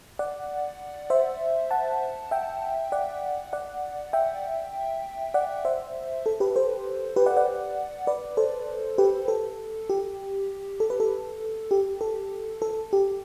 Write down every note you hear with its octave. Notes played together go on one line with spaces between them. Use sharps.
D5 F#5
C5 E5
F#5 A5
E5 G5
D5 F#5
D5 F#5
E5 G5
D5 F#5
C5 E5
A4
G4 B4
A4 C5
G4 B4
D5 F#5
D5 F#5
B4 D5
A4 C5
G4 B4
A4
G4
A4
B4
A4
G4
A4
A4
G4